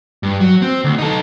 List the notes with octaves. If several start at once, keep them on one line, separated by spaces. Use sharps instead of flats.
G2
F#3
C4
D2
D#4 A4